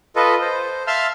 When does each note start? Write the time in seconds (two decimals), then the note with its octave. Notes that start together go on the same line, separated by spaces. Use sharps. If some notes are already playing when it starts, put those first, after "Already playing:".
0.16 F4 A4 B4 D#5
0.41 C5
0.87 E5 F5 A5 C6 E6 F6